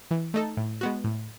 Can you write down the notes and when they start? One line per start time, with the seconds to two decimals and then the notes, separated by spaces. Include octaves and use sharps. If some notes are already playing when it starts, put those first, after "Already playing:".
0.11 E3
0.34 A3 D#4 A4
0.57 A2
0.81 G#3 B3 F#4
1.04 A2